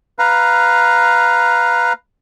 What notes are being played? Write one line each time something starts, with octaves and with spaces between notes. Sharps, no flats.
B4 F5 A#5